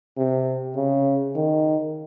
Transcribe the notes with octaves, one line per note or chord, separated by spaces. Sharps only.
C3
C#3
D#3